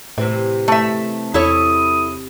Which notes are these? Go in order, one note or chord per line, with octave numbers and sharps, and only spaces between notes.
A2 C3 E3 C4
A3 E5
E2 E4 A4 C#5 D#6